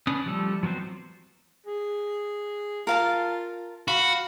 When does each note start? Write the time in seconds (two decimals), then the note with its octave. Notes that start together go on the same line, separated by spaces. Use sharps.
0.07 C#4 D4 B4 D#6
0.26 F3 G3 A3 A4
0.63 F3 F#3 B3 C4 C5
1.66 G#4
2.87 F4 A#4 F5 A5
3.88 F#4 F5 B5